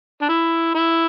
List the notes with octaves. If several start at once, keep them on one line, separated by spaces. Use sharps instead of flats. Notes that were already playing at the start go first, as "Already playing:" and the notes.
D4
E4
E4